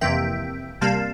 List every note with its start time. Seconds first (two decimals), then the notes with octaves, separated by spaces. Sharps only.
0.01 F2 C3 E3 A#3 E5 G5
0.81 C3 G3 A#3 F5 A5